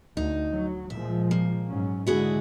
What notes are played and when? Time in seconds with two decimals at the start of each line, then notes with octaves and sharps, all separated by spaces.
0.17 D2 D#4
0.50 F#3
0.90 A#2 F3 G#3 E5
1.31 A#3
1.67 G#2 F#3 C#4
2.07 D3 G#3 E4 F#4 G#4